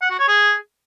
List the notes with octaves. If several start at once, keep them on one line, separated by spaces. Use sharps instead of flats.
F#5
F#4
C#5
G#4